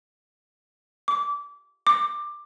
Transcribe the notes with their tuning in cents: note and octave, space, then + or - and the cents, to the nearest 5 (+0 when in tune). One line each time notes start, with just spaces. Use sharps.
D6 -25
D6 +15